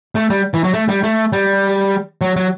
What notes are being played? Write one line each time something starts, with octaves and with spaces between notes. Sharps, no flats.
A3
G3
E3
F#3
A3
G3
A3
G3
F#3
F#3